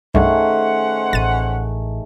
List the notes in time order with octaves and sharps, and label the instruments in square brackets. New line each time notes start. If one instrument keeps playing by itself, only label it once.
[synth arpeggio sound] C2 G2 [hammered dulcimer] D#3 A3 G#4 [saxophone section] C#4 C5 F#5
[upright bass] A1 [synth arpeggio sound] A6 D#7